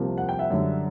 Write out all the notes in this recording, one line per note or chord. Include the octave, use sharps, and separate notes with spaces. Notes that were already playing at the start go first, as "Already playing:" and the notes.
Already playing: C2 C3 F3 A#3
F#5
G5
E5 F#5
F#2 D3 G3